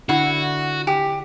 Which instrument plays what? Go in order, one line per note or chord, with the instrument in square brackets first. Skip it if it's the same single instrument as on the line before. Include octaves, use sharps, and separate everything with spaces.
[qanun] D3 E4 [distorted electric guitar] F#4 [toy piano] F#5 B5
[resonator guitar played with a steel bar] G4 [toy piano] G#5